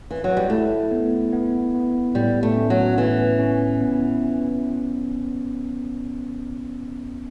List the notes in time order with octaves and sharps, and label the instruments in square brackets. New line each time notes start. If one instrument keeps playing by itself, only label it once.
[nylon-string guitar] E3
F#3
G3
[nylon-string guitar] A3 [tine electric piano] E4
[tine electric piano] B3
B3
B3
[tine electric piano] A2 [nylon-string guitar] G3
[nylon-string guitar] A3
[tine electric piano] C#4
[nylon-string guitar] F#3
[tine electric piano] A2 [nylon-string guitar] E3
[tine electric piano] C#4
B3